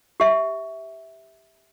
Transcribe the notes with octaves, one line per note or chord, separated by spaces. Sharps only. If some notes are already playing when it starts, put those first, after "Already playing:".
G4 E5